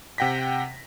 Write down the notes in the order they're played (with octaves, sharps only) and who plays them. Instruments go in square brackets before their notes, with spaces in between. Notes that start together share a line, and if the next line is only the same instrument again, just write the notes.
[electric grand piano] C3 F#5 G5 A#6 B6